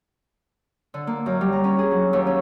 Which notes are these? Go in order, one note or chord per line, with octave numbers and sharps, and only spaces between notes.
D3
A#3
F#2
G3
A#5
C#4
G#4
F#3
D#2
C#4